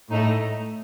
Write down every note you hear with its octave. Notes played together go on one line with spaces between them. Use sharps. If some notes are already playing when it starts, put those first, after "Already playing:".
A2 A3 D#4